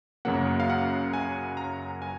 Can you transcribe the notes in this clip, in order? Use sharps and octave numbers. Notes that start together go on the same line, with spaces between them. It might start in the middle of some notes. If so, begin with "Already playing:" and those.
F#2 C#3 F#3 A#3 F#5
F5
F#5
G#5
A#5
G#5